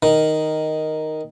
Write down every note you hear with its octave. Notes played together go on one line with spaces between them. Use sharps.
D#3